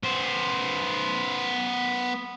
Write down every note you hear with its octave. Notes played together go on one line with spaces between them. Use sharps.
B3 C5